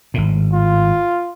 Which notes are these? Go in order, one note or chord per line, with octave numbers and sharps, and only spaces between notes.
G#1 A2
F4